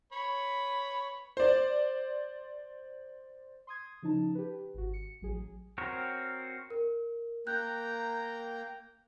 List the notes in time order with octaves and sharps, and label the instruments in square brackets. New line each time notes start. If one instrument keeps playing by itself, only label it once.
[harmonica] B4 C#5 B5
[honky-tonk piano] C5 D5
[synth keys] C6 D#6 G#6
C#3 F3 D#4 A5
G4 B4
G#1 F#4
C#7
A1 F#3 G#4
[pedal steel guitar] C4 F#4 A#4 C#5
[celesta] A#4
[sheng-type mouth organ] A#3 G5 A#5 [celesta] F#6 G6